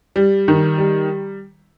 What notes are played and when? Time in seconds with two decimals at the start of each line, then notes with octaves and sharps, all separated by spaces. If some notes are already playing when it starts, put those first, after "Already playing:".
0.16 G3
0.48 D#3
0.78 G3